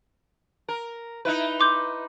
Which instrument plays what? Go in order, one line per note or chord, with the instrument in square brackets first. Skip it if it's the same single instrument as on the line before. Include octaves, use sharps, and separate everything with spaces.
[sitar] A#4
D#4 E4 B4
[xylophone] C6 D6 G6